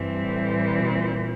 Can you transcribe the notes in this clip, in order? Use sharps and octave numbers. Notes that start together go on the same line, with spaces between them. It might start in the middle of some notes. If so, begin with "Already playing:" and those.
Already playing: G2 E3 G3 C4
A2
A#2
B2
A#2